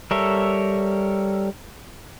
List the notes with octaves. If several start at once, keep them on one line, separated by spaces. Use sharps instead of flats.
G3 A4 A#4 C#5 E5